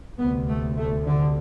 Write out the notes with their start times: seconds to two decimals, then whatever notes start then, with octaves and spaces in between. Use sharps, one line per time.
0.19 D2 C3 B3
0.49 A3
0.78 A3
1.06 D3